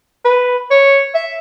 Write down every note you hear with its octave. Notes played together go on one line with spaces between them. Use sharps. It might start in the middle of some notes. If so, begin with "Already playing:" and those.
B4
C#5
E5